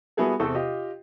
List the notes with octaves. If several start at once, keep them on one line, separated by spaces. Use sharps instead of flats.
G3 B3 E4 F#4 G#4 A4
E2 C3 C4 A4 C5 C#6
F4 G4 D#5